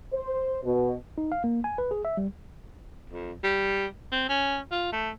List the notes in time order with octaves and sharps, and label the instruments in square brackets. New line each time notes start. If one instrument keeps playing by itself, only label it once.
[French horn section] C5
B2
[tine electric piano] D#4
F5
A#3
G#5
B4
G#4
E5
G3
[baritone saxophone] F2
G3
C4
C#4
F4
A3